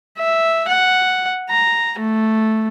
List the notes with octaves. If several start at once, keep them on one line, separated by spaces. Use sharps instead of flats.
E5
F#5
A#5
A3